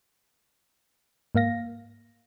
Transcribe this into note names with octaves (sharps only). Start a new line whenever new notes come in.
G#2 A#3 F5 A#6